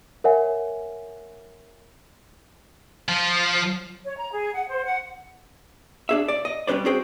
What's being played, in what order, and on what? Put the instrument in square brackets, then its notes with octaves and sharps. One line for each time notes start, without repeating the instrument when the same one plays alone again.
[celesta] A#4 C#5 E5 F#5 G#5
[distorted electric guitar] F3
[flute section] C#5
A#5
G#4
F#5
C5
F#5
[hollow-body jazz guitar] D4 G#4 E5
D5
D#5
G3 C#4 B4 C5 D5
C4 F#4 G#4 C5 G5